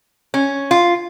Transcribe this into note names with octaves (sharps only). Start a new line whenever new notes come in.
C#4
F4